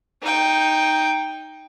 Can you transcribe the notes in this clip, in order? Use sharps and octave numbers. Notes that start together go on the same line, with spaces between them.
D#4 G5